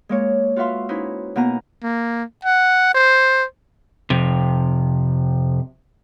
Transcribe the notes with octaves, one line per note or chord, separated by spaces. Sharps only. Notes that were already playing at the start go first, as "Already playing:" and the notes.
G#3 A#3 C#5
F4 F#4 B4 E5 F5 C6
C#4 D#4 E4 B4 C5
B2 A#3 B3 G#5 A#5
A#3
F#5
C5
F2 C3